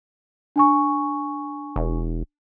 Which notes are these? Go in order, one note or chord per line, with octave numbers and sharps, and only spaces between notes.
D4 G#5 C#6
E1